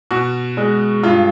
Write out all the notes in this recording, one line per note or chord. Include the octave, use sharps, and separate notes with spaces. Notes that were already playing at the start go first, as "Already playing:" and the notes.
B2 F#4
G#3
G2 F4